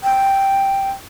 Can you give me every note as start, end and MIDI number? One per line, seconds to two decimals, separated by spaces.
0.04 0.89 79